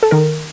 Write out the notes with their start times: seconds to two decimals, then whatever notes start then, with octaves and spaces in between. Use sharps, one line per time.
0.03 A4
0.11 D#3 A#4